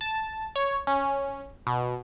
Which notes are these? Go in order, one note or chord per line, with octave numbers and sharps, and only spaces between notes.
A5
C#5
C#4
B2